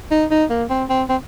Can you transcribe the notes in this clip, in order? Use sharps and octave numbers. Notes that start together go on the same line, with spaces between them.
D#4
D#4
A#3
C4
C4
C4